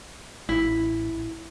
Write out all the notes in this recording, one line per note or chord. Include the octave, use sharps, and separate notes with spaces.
A1 E4